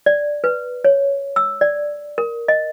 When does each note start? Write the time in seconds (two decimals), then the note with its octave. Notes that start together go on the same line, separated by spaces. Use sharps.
0.06 D5
0.44 B4
0.84 C#5
1.36 E6
1.61 D5
2.18 A#4
2.48 D#5